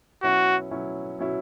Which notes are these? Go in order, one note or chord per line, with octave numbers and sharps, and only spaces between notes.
B2 F#3 C#4 E4 F#4
B2 F#3 C#4 E4
B2 F#3 C#4 E4